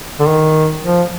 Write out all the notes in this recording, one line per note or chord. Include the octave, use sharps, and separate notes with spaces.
D3
D#3
F3